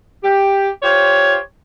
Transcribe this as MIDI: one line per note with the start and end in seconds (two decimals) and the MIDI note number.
0.24 0.70 67
0.82 1.36 65
0.82 1.36 67
0.82 1.36 72
0.82 1.36 73